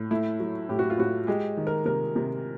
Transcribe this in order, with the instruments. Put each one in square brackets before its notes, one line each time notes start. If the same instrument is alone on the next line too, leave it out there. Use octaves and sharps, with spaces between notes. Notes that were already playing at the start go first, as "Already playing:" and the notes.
Already playing: [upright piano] A2
A3 E4
F#3
A2 G4
F#4
F4
A2 F#4
G#3 G4
D#3
A#4
C3 A#4
C3